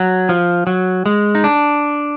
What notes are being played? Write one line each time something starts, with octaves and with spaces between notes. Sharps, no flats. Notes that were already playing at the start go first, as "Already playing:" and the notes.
Already playing: F#3
F3
F#3
G#3
D#4
D4